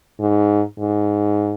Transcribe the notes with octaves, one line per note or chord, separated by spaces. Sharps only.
G#2
G#2